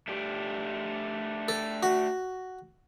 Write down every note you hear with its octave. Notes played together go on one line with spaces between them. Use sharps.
A3 D4 G4
A4
F#4